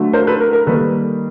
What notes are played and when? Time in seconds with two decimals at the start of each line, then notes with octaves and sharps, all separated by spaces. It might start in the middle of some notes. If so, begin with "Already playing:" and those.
Already playing: D3 F#3 A3
0.13 A#4 C5
0.27 A4 B4
0.40 A#4
0.53 A#4
0.67 D#3 G3 A#3 A4 B4